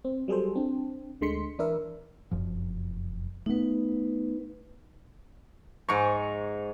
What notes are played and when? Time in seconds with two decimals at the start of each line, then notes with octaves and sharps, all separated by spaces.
0.05 C4
0.28 F#3 G3 G#4 A4 C5
0.55 C4 D4
1.21 D2 D3 G#3 C6 B6 C#7
1.59 E3 D4 E4 A#4 E5
2.31 F1 F#2 F3
3.46 A3 B3 D#4 B4
5.89 G#2 A#5 C#6